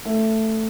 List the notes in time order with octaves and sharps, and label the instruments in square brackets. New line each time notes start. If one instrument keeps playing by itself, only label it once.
[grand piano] A3